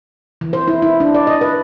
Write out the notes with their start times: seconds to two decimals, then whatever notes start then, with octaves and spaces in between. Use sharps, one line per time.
0.41 E3
0.53 C5
0.68 E4
0.82 E4
1.00 D4
1.14 D5
1.27 D#5
1.41 B4